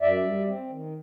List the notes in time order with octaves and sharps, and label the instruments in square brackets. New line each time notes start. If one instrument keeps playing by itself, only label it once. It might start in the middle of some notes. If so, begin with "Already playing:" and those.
[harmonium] F#2 D5 E5
G3
C4
D#3